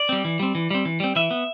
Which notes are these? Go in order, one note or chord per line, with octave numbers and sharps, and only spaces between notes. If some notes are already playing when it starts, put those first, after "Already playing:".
Already playing: D5
G3 C4
E3
G3 C4
E3
G3 C4
E3
G3 C4
E3 E5
B3